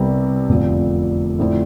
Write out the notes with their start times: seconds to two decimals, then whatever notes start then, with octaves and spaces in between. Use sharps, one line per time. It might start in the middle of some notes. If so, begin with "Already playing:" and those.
Already playing: C2 C3 G3 B3
0.49 F1 E2 D3 F3 C4
1.39 F2 D3 A3 E4